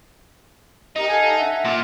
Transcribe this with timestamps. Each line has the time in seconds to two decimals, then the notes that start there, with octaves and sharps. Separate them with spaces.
0.96 D#4 G4 A#4 A#5
1.08 A4 F5 G#5
1.36 E5 F#5
1.65 A#2